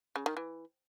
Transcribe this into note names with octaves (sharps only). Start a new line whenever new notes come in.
C#3
D#3
E3